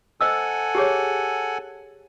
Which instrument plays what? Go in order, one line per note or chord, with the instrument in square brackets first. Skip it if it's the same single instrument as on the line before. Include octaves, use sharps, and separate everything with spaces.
[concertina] A4 F#5 G#5 [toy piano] C5 D#5 E6
[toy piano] G4 G#4 C#5